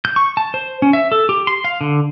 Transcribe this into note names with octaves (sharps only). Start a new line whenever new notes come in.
G6
C#6
A5
C5
C#4
E5
A4
G4
C6
F5
D3